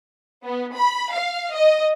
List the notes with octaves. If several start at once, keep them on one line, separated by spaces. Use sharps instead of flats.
B3
B5
F5
D#5